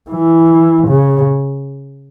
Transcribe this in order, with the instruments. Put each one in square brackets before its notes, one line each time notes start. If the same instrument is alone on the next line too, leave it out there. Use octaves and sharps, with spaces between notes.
[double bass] E3
C#3